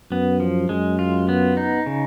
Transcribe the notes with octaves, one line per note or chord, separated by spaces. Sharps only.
F#2 B3
F3
F#2 G#3
F4
B3
D#4
C#3